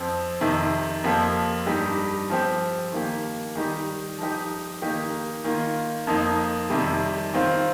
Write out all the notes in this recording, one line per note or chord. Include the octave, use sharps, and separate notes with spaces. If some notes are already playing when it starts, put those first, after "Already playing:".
Already playing: F2 F3 C4
F2 C3 D#3
F2 F3 A#3 G4
G2 G3 D#4 G4
F3 C4 G4
D#3 A#3 G4
D#3 G3 D#4 G4
F3 D#4 G4
D#3 A#3 D#4 G4
D#3 A#3 F4
F2 F3 A#3 D#4
F2 C3 D#3 G3
D#3 C4 F4